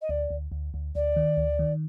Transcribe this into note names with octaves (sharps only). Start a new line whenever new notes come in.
D#5
D2 D5
D2
D2
D2
D2 D5
D#3
D2
D#3